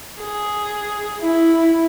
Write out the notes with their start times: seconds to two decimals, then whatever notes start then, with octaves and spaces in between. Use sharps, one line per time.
0.21 G#4
1.21 E4